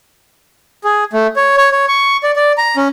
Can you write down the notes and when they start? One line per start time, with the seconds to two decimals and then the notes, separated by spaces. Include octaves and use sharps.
0.84 G#4
1.13 A3
1.36 C#5
1.57 C#5
1.72 C#5
1.88 C#6
2.23 D5
2.36 D5
2.58 A#5
2.77 C#4